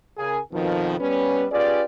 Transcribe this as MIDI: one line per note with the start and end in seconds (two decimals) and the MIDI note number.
0.18 0.39 49
0.18 0.39 68
0.18 0.39 70
0.18 0.39 80
0.52 0.96 41
0.52 0.96 47
0.52 0.96 51
0.52 0.96 53
0.99 1.45 55
0.99 1.45 59
0.99 1.45 61
0.99 1.45 71
1.51 1.82 61
1.51 1.82 65
1.51 1.82 67
1.51 1.82 68
1.51 1.82 71
1.51 1.82 74